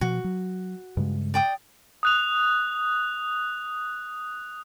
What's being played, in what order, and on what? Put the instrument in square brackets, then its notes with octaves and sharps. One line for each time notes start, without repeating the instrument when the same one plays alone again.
[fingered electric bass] B2 F3 [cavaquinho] F#4
[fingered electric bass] F#3
G2 C#3 G#3
[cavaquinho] D5 G5 D#6
[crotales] D#6 F#6 F7